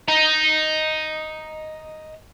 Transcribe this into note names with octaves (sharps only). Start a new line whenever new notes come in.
D#5 A#5